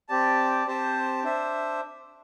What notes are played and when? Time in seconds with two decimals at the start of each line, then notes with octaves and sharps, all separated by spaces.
0.09 C4 G4 D5 A5
0.67 C4 G4 C5 A5
1.23 D4 C5 E5